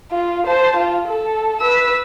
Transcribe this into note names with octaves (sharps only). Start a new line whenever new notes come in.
F4
C5 A5
F4
A4
B4 E6